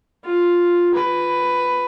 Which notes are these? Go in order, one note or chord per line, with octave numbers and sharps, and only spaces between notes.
F4
B4